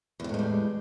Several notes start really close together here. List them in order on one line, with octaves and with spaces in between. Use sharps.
E2 C3 A2 G#3 G3